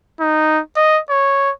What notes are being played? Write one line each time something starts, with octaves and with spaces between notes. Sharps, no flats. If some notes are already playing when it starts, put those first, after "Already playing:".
D#4
D#5
C#5